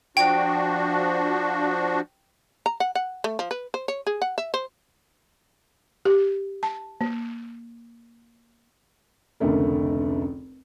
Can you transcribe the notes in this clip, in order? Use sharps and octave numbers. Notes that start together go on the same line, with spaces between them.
F3 D4 F#4 G5
A#5
F#5
F#5
A3
F3
B4
C5
C#5
G#4
F#5
E5
C5
G4
A5
A#3
F1 C#2 D3 A3 A#4